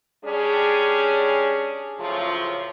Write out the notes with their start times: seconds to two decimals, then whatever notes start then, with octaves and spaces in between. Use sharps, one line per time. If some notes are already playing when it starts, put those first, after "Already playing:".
0.25 G3 C#4 D4 G#4
1.99 F#2 A2 C#3 F3 F#3 F4